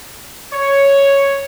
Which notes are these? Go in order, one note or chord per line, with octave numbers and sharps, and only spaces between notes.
C#5